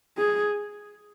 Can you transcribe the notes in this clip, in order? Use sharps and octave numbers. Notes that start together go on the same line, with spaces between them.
G#4